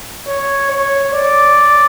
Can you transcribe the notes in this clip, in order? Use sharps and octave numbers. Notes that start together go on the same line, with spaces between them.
C#5
C#5
D5